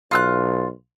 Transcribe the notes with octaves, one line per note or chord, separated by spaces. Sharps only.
B1 F4 E6 F#6